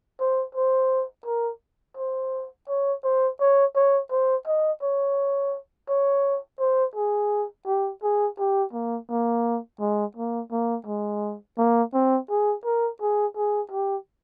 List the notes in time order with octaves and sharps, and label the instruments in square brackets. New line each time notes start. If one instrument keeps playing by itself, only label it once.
[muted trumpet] C5
C5
A#4
C5
C#5
C5
C#5
C#5
C5
D#5
C#5
C#5
C5
G#4
G4
G#4
G4
A#3
A#3
G#3
A#3
A#3
G#3
A#3
C4
G#4
A#4
G#4
G#4
G4